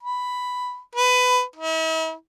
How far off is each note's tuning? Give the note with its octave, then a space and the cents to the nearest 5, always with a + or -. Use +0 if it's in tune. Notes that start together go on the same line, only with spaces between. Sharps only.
B5 +5
B4 +20
E4 -45